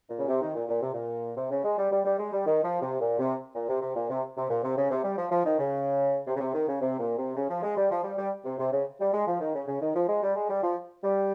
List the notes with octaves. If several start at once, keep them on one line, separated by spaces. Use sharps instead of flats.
A#2
C#3
C3
D#3
A#2
A#2
C3
A#2
C3
C#3
G#3
G3
G3
G3
G#3
G3
D#3
F3
C3
A#2
C3
A#2
C3
C3
A#2
C3
C3
A#2
C3
C#3
C3
G3
F3
F3
D#3
C#3
C3
C#3
C3
D#3
C#3
C3
A#2
C3
C#3
F3
G#3
G3
F3
G3
G3
C3
C3
C#3
G3
G#3
F3
D#3
C#3
C#3
D#3
F3
G#3
G3
G#3
G3
F3
G3